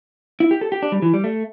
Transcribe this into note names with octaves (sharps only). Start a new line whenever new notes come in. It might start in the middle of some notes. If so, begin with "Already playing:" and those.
E4
G4
A4
G4
D4
G3
E3
G3
A3